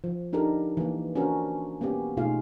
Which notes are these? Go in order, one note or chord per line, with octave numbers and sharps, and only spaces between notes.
F3
D4 D#4 G4 A4 A#4
E3 A#3
C#4 D4 F#4 A#4 C5
A#3 B3 C#4 G4
B2 A3 D#4 F4 G#4 F5